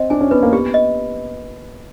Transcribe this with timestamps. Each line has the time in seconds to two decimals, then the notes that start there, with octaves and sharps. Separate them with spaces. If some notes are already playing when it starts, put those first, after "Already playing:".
Already playing: C4 D#5
0.10 D4 G#5
0.21 C#4
0.31 B3 B4
0.43 A#3
0.53 B3 G4
0.74 D#5